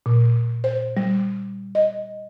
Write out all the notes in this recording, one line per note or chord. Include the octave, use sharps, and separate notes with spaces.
A#2
C5
G3
D#5